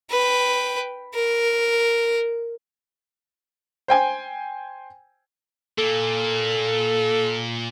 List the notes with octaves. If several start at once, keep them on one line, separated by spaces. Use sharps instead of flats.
B4 G5
A#4
C5 G5 G#5
A#2 A#3 A4